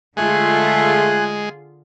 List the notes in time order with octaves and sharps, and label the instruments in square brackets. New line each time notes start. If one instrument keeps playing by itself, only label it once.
[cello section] D3 F4 G#4 [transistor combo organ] G#3 [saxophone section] A3 [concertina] G#5 F#6